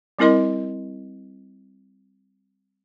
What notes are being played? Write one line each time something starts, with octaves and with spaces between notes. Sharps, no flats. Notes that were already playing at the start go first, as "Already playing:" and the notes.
G3 C4 E4 A#4 D#5 C6